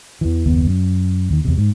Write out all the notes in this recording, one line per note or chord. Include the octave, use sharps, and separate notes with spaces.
E2 E3
F#1 D#2 B3
F#2
D#2 D#3
E2 C3
G#2